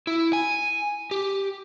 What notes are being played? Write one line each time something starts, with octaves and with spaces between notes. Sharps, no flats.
E4
G#5
G4